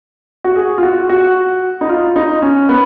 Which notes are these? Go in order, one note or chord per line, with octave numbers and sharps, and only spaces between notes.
F#4
G#4
F4
F#4
F#4
D#4
F4
D#4
C#4
B3